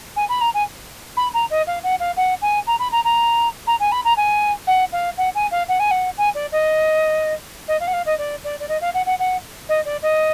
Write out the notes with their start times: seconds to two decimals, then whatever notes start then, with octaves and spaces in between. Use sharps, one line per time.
0.16 G#5
0.29 B5
0.41 A#5
0.54 G#5
1.17 B5
1.34 A#5
1.50 D#5
1.67 F5
1.83 F#5
2.00 F5
2.17 F#5
2.42 G#5
2.67 A#5
2.79 B5
2.92 A#5
3.04 A#5
3.67 A#5
3.80 G#5
3.92 B5
4.05 A#5
4.17 G#5
4.67 F#5
4.92 F5
5.18 F#5
5.35 G#5
5.51 F5
5.68 F#5
5.79 G#5
5.91 F#5
6.18 G#5
6.35 D5
6.52 D#5
7.68 D#5
7.80 F5
7.87 F#5
7.93 F5
8.06 D#5
8.18 D5
8.44 D5
8.60 D5
8.69 D#5
8.81 F5
8.94 F#5
9.06 F#5
9.19 F#5
9.69 D#5
9.85 D5
10.02 D#5